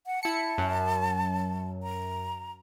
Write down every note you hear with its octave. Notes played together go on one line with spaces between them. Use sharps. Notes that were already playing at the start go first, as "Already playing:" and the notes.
F#5
E4 A5 C#7
F#2
A#5